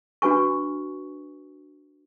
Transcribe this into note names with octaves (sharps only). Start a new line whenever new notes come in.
D4 F#4 B4 G#5 C#6